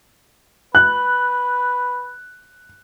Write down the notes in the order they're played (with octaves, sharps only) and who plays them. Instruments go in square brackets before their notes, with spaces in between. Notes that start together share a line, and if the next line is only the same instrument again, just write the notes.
[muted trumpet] B4 [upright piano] F#6